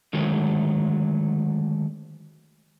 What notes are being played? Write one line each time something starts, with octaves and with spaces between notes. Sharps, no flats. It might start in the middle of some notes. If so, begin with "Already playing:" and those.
D3 D#3 F#3 G#3 A3